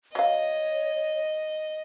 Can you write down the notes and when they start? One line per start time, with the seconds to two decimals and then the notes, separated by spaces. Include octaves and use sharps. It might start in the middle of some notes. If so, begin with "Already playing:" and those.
0.15 F#3 C#5 D#5 F5